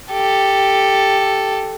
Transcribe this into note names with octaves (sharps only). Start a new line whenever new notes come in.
G4 A4